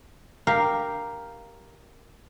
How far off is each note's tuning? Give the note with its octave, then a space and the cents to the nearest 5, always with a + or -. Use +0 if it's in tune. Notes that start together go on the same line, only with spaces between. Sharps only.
G4 +0 A#4 +0 F5 +0